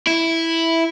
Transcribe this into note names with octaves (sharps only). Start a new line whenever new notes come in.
E4